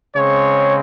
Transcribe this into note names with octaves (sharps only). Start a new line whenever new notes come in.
C#3 G#3 C4 C#5